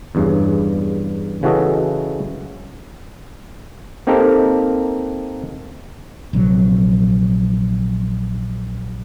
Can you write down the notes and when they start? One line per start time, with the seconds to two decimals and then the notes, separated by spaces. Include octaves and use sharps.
0.15 E2 G2 C#3
1.43 C#3 E3 F#4 A4 D#5
4.07 A#3 C4 D#4 G4 A4 A#4
6.33 A#1 C3 F#3